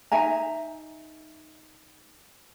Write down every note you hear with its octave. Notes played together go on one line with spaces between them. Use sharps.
D#4 E5 G#5 A#5